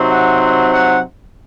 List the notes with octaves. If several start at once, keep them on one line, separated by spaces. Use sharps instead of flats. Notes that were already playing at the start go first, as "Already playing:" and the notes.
Already playing: C3 F#3 C4 D#4
F#5
F#5
F#5